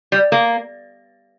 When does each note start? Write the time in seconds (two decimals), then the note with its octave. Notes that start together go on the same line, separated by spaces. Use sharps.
0.12 G3
0.32 A#3